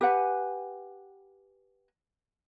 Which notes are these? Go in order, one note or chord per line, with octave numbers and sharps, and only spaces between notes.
G4 B4 F#5 G#5